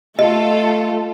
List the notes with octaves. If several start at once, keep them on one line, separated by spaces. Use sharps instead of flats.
A3 F4 A4 D#5